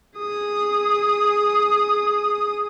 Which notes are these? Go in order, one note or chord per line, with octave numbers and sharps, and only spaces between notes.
G#4 D#6